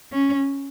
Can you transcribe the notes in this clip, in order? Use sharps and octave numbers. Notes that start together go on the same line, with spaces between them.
C#4